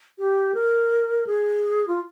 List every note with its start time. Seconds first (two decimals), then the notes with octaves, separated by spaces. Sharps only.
0.18 G4
0.54 A#4
1.27 G#4
1.87 F4